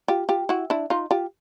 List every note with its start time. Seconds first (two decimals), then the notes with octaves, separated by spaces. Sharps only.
0.08 F4 G4
0.29 F4 G4
0.49 E4 F#4
0.70 D4 E4
0.90 D#4 F4
1.11 F4 G4